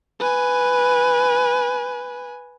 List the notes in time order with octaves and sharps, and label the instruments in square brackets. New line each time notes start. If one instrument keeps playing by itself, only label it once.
[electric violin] B4 G#5